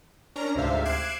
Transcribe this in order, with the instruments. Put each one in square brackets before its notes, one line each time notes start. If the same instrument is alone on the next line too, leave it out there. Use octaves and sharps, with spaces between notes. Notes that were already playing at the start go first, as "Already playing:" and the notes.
[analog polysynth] C#4 D4 A#4 A#5
D2 G#2 C3 C5 E5 F5
D6 F#6 G#6 C7 D7 E7